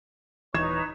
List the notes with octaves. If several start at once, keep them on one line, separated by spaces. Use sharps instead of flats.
D#1 E3 D#4 B4 C#5 A#5 G#6 E7